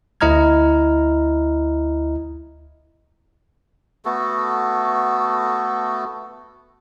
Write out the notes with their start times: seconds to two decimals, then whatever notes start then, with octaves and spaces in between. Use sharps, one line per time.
0.21 D2 E4 D#5 A#5 F6 G#6
4.05 A3 B3 F#4 A4